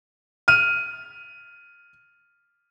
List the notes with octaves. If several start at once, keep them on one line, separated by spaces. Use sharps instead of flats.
F6 D#7